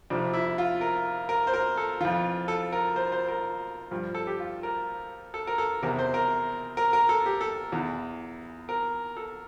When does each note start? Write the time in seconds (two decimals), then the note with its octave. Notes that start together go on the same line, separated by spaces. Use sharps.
0.10 F2 C3 F3 D4
0.33 E4
0.58 F4
0.81 A#4
1.29 A#4
1.47 C5
1.54 A#4
1.77 A4
2.01 F2 E3 F4
2.48 A4
2.73 A#4
2.96 C5
3.12 C5
3.28 A#4
3.91 G2 F3
4.15 A4
4.27 G4
4.40 F4
4.63 A#4
5.34 A4
5.47 A#4
5.58 A4
5.82 E2 C3 E3 A#4
5.99 C5
6.14 A#4
6.77 A#4
6.93 A#4
7.09 A4
7.26 G4
7.41 A4
7.72 E2 E3
8.69 A#4
9.17 A4